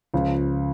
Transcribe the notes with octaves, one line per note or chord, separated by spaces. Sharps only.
C#2 C#3 F3